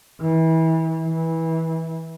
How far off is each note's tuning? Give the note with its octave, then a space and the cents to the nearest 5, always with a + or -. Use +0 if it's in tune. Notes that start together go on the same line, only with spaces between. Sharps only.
E3 -30
E3 -20